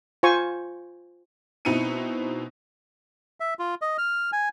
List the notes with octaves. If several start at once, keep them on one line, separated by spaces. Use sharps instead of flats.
F4 C5 G#5 C#6
B2 C4 D#4 E4 C#7 D#7
E5
F4
D#5
F6
G#5